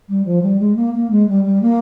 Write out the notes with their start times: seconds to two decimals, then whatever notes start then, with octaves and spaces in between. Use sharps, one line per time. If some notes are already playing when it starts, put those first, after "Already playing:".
0.09 G3
0.25 F3
0.42 G3
0.59 G#3
0.76 A#3
0.94 A#3
1.11 G#3
1.28 G3
1.45 G3
1.62 A#3